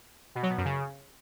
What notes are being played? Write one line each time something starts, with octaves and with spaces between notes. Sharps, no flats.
B2
F#3
B2
F#2
C#3